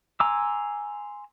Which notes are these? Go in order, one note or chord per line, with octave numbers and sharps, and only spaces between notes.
G#5 A#5 C6 D6 E6